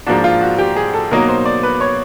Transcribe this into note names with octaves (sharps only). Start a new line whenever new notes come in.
G#2 F3 A#3 D4 F#4
F4
F#4
G4
G#4
A4
B2 F#3 A#3 D#4 A#4
C5
D5
B4
C#5